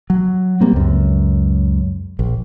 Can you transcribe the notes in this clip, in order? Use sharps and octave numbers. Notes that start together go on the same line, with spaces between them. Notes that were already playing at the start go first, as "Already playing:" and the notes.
F#3
G3 A#3 C4
C#2 F#2
A#1